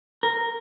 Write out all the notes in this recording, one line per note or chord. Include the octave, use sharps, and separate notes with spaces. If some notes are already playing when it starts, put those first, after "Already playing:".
A#4